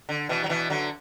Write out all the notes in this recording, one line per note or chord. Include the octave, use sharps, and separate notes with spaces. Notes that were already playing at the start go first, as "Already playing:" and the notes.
D3
B2 E3
F#3
B2 E3
D3 F#3